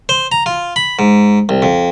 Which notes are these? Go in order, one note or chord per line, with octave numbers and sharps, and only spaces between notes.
C5
A#5
F4
B5
G#2
C2
F2